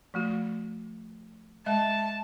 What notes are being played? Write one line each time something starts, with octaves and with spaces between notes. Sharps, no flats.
F3 A3 F#4
G#3 D#5 E5 A5